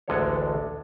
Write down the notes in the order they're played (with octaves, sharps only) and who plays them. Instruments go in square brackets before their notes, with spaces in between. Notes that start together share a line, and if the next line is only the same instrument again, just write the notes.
[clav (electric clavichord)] A1 D2 D3 G#3 A4 C#5